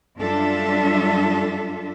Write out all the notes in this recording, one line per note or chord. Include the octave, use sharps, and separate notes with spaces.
F#2 G3 D4 F4 A4 E5